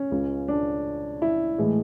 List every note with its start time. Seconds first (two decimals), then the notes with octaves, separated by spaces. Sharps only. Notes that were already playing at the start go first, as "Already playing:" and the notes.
Already playing: C#4
0.11 C#2 C#3 G#3
0.48 D4
1.22 E4
1.58 A2 E3 G#3